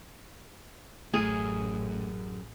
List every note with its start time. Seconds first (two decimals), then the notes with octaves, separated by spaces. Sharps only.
1.14 A1 F#2 A3 G#4